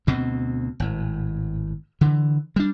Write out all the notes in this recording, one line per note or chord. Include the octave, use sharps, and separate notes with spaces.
D2 B2 C4
G#1 A2
D3 E3
G3 D4